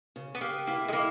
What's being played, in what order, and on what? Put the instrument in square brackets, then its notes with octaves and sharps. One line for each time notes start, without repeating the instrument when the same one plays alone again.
[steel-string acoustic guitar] C#3
[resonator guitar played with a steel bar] B3
[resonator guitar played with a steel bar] A#3 [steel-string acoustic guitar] G4
[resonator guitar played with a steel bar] A#3 [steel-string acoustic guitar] E4
[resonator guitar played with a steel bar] G#3
[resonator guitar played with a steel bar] A#3 [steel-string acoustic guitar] E4